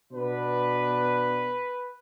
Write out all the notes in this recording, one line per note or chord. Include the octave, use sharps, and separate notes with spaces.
B2 B3 D4 B4